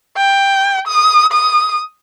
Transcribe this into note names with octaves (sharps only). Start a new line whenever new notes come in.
G5
D#6
D#6